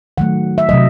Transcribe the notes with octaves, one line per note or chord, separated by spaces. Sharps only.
D#3 F#3 A3 F#5
E5
C3 F#3 A3 D#5